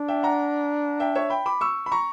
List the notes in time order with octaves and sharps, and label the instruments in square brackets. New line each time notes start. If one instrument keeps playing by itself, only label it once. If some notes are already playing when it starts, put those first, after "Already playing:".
Already playing: [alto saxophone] D4
[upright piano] E5 G5
F#5 A#5
E5 G5
C#5 E5
G5 B5
B5 D6
C#6 E6
B5
A#5 C#6